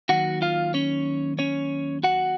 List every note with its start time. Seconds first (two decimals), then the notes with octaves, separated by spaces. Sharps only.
0.09 D#2 D#3 F#3 F#4 F#5
0.42 F4 F5
0.74 C#4 C#5
1.39 C#4 C#5
2.03 F#4 F#5